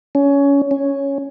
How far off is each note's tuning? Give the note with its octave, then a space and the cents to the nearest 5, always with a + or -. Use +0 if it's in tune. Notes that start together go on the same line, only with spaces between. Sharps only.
C#4 +20
C#4 +0